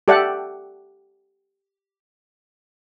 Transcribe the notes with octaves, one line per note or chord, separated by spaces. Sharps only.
G4 A4 D5 E5 F#5 G5